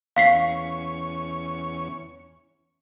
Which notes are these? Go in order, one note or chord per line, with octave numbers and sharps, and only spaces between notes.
E2 C#4 F5 C#6 B6 C7